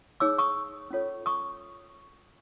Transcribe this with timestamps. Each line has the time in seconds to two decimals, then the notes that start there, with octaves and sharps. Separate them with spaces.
0.20 D#4 G#4 C#5 D6 E6
0.38 C#6 D#6
0.90 C#4 F4 A4 C#5
1.26 C#6 D#6